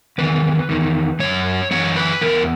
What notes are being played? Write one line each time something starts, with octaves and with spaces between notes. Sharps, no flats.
E2 D#3 B4
E2 D#3
F#2 E3 C#5
F#2 E3 C#5
B4
E2 C#3 E3 A#4